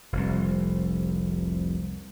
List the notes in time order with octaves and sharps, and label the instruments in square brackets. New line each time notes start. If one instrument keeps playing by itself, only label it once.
[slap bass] F1 C2